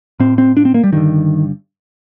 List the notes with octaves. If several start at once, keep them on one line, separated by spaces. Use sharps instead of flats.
A2 C4
C4
D4
C4
A#3
G3
G2 D3 D#3